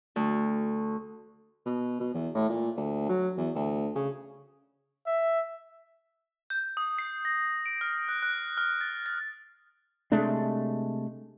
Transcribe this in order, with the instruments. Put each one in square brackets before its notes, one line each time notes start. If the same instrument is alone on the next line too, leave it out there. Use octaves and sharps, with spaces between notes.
[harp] D2
[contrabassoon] B2
B2
E2
A2
A#2
D2
F#3
E2
D2
C#3
[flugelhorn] E5
[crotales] G6
D#6
C7
A#6
D7
F6
F#6
F#6
F6
A6
A6
[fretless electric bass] C3 G#3 A3 D4